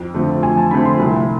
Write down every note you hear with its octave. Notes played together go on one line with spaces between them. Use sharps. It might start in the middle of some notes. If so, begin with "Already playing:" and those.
Already playing: F2
D3 F3 A3 C4
F2 G#5
A5
D3 F3 A3 C4 B5
C6
C2